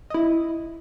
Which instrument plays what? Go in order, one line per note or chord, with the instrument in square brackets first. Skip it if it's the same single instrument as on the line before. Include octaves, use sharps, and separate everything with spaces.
[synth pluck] E4 D#5